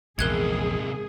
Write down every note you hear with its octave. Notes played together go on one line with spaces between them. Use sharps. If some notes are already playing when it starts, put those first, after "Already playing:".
A#1 E2 G#2 C3 G#4 A#4 F#6 G#6